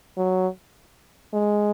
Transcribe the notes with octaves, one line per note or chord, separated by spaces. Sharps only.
F#3
G#3